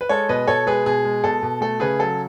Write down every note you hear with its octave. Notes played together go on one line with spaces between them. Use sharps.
B4
G#3 A4 C#5
B2 B4 D#5
B2 A4 C#5
G#3 G#4 B4
B2 G#4
G#3
B2 A4
B2
A3 A4
C#3 G#4 B4
F#3 A4